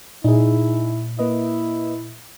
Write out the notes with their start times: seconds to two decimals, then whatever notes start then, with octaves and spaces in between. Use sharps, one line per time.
0.24 A#2 D#4 E4 G#4
1.19 A#3 E4 B4 D#5